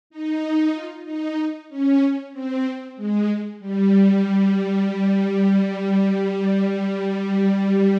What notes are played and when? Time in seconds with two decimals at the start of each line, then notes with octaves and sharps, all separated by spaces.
0.10 D#4
0.73 F4
1.05 D#4
1.69 C#4
2.33 C4
2.96 G#3
3.60 G3